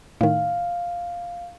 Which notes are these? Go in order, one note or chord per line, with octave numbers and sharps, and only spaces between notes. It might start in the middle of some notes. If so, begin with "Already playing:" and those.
A2 D#3 F5